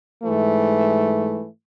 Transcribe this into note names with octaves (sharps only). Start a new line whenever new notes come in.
G#2 E3 A3